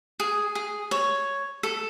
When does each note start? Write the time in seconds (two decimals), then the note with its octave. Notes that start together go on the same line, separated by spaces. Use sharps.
0.20 G#4
0.55 G#4
0.91 C#5
1.63 A4